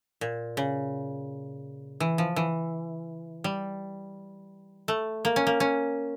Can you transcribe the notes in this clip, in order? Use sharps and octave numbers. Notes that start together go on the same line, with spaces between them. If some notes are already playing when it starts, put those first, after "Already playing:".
A#2
C#3
E3
F3
E3
G3
A3
A#3
C#4
A#3
C#4